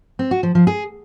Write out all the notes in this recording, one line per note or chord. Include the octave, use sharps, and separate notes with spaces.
C4
F#4
F3
F3
G#4